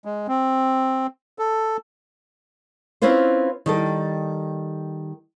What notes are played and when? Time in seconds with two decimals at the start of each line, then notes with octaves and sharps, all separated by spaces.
0.05 G#3
0.28 C4
1.39 A4
3.02 C4 C#4 E4 F4 B4 C5
3.66 D#3 G3 A4